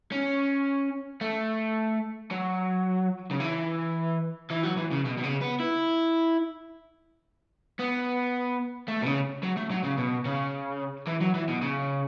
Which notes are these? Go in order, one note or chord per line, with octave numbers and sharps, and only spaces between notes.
C#4
A3
F#3
C#3
E3
E3
F#3
E3
C#3
B2
B2
C#3
B3
E4
B3
A3
B2
C#3
F#3
A3
F#3
C#3
B2
C#3
E3
F#3
E3
B2
C#3